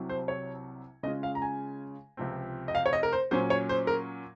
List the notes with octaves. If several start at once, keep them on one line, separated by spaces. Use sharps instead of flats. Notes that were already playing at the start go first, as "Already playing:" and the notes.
Already playing: C2 C3 F#3
C5
C#5
C#3 G#3 C#4 F4 D#5
F5
A#5
G#5
C#2 C3 F3 C4
D#5
F5
C#5
D#5
A#4
C5
A#2 F#3 C#4 C5
C#5
C5
A#4